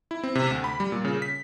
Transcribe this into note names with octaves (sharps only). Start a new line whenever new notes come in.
E4
C4
C3
D2
B5
G3
A#2
C#3
B6